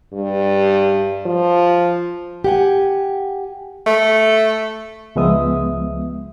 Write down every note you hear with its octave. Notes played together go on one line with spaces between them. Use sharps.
G2
F3
G4 F#5 G#5
A3
C#2 F3 G#3 B3 E5 D#6